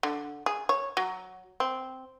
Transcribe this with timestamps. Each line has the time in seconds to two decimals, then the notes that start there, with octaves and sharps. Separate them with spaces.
0.03 D3
0.46 G#4
0.69 C#5
0.97 F#3
1.60 C4